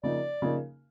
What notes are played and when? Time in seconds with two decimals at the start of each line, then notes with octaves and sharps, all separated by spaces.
0.03 C#3 F3 A#3 D#4 D5
0.42 C#3 F3 A#3 D#4